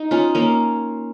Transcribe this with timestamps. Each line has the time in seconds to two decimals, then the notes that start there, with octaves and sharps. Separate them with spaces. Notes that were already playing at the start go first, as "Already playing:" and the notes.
Already playing: D#4
0.11 C#4 F4
0.35 A#3 C#4